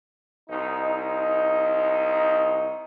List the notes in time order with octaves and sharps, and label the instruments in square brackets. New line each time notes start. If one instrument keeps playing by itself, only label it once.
[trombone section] C2 D#4